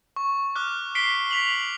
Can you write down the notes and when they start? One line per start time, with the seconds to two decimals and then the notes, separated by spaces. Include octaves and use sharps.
0.16 C#6
0.56 D6 F6 F#6
0.95 B6 C7 D7 G7
1.31 B6 F7 F#7